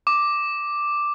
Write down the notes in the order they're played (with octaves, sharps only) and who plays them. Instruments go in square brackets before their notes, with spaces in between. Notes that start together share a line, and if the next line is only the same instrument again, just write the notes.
[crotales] D6